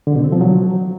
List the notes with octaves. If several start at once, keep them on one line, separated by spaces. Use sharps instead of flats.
D3
B2
C4
F3
F#3